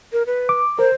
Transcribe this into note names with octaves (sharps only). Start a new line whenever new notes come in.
A#4
B4
D6
A#4 C5